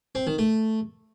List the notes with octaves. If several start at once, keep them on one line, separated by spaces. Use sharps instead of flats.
C4
D#3
A3